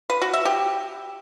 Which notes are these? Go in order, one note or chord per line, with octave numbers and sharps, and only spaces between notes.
B4
F#4
E5
G4